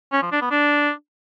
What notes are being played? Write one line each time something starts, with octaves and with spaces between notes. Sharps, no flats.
C#4
F3
D4
B3
D4